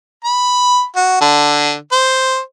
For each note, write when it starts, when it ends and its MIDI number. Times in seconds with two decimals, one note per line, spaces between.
0.25 0.85 83
0.96 1.18 66
1.21 1.75 50
1.92 2.40 72